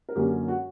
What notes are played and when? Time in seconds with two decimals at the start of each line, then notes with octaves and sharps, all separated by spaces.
0.09 A#4
0.16 F#2 D3 A#3 C#4 G4
0.48 F#4